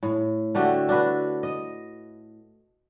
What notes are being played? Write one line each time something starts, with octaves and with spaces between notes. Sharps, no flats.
A2
D3 A3 F#4 G4
D4 F#4 B4
D#5